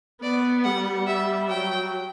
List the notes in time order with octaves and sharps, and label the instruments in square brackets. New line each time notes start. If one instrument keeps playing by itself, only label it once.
[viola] B3 [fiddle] D5
[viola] G3 [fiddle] F#5
[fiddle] E5
[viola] F#3 [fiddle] G5